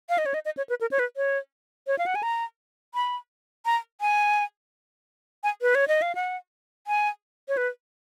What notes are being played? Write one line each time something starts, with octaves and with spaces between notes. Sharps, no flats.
F5
D#5
C#5
D#5
D#5
C#5
B4
A#4
C#5
B4
C#5
C#5
F5
F#5
G#5
A#5
B5
A#5
G#5
G#5
B4
C#5
D#5
F5
F#5
G#5
C#5
B4